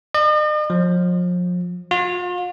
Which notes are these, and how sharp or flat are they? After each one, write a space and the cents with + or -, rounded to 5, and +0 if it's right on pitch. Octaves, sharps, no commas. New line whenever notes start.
D#5 -45
F3 +35
F4 +40